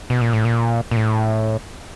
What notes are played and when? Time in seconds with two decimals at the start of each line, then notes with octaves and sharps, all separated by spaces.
0.10 B2
0.21 A#2
0.33 A2
0.45 A#2
0.91 A#2
0.96 A2